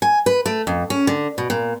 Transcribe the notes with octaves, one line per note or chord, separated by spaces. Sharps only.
G#5
B4
A3
F2
C#4
D3
B2
A#2